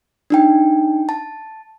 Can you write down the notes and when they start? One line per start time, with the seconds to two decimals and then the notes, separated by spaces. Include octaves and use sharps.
0.30 D4 D#4 G5
1.09 A5